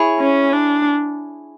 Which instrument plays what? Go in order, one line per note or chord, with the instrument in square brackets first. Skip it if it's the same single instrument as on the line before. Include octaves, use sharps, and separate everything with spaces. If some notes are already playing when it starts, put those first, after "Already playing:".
Already playing: [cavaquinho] E4 G#4 C#5
[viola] C#4
D4